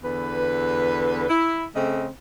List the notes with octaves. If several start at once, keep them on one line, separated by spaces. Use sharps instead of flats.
E2 D3 B4
E4
C#3 A3 C4 D#5